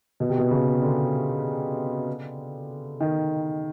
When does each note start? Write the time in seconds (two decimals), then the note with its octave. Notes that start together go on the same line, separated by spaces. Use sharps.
0.20 B2
0.29 C3
0.38 B2
0.51 C#3
0.82 D3
3.00 D#3